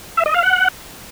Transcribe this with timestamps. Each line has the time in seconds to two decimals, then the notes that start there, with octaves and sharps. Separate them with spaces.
0.17 E5
0.26 D#5
0.34 F5
0.43 F#5